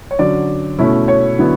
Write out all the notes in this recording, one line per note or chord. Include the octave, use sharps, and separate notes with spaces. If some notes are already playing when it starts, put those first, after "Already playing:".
C#5
D3 F#3 C#4 D5
B2 A3 C#4 E4
C#5
D3 F#3 B3 E4